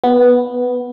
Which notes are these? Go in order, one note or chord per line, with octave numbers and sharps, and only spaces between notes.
B3